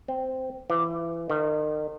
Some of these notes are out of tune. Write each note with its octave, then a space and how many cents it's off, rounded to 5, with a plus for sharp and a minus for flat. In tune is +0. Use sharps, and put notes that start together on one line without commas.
C4 -10
E3 +25
D#3 -40